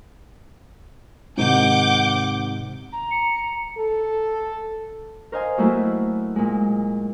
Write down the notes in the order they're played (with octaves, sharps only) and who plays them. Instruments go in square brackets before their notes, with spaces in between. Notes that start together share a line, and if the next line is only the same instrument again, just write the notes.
[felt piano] G#2 C3 D#3 [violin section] F#5 D6 G6
[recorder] A#5
[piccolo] C#7
[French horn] A4
[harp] A#4 C5 D#5 F5 G#5
F#3 A3 A#3 E4 F#4
A#2 G#3